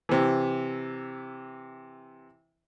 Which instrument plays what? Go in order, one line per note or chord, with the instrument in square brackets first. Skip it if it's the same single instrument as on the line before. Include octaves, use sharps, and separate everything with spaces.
[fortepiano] C3 E3